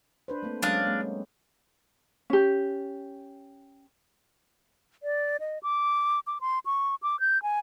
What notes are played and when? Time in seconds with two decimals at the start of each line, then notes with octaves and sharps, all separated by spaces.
0.28 D4 B4 C5
0.43 A3 A#3 C4
0.62 F#3 G#3 C#4 D4 F5 D#6
0.87 G#3 A#3 C4
2.30 C#4 G4
5.03 D5
5.40 D#5
5.63 D6
6.27 D6
6.41 C6
6.66 C#6
7.03 D6
7.20 G6
7.43 G#5